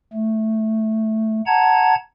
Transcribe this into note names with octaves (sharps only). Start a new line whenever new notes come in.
A3
F#5 A5 A#5 G#6